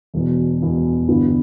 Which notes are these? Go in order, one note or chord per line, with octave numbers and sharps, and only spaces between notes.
E1 E2 B2
E1 E2 B2
G1 G2 E3 B3 E4